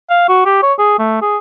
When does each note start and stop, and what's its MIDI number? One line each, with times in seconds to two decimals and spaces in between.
0.10 0.25 77
0.29 0.42 66
0.46 0.60 67
0.63 0.74 73
0.79 0.99 68
0.99 1.21 57
1.22 1.38 68